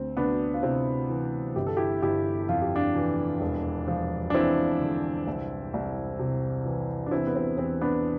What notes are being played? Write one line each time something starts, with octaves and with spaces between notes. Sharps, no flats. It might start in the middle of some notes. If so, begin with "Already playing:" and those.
Already playing: D2 C4
D2 B3 D4
F4
C3 C4 E4
E3
G1 G4
A4
E4 G4
G1 E4 G4
F2 F4
G4
D4 F4
E3
E1
F3
D4
E2 C4 E4
D3
C2
C2
C3
E3
D4
E2 C4 E4
B3
C4
E2 C4
B3 D4